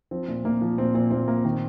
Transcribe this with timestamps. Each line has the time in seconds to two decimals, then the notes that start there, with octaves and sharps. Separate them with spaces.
0.11 F3 C4
0.28 A#2
0.45 A#2 A#3
0.61 F3
0.78 A#2 C4
0.95 A#2 C4
1.11 A#2 C4
1.28 A#2 A#3
1.45 D#3 C4